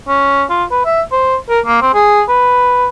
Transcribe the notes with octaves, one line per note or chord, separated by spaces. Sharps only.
C#4
F4
B4
E5
C5
A#4
A#3
C4
G#4
B4